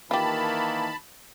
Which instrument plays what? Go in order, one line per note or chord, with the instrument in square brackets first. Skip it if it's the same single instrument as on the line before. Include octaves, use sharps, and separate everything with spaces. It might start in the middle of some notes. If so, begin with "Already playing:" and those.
[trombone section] D#3 E3 A#3 [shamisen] F4 G4 [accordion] A5 B5